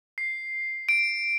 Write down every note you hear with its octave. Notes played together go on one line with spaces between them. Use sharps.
C7
D7